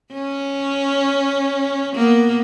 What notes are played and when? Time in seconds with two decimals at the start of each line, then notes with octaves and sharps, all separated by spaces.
0.14 C#4
1.95 A#3 B3